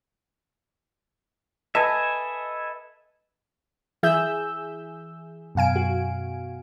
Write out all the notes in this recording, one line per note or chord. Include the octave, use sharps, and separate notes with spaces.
A4 B4 D#5 E5 G#5
E3 G#4 E5 E6 G6
F#2 B2 F5 G#5 D7
F#4